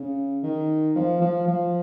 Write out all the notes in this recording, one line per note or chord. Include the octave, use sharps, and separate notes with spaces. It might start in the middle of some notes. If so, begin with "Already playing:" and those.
Already playing: C#3
D#3
F3
F3
F3